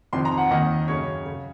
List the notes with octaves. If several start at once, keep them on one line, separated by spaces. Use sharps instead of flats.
F2 C3 D#3 C6
A#5
F#5
D#2 D#3 D#5
F#2 C#3 C#5
C#3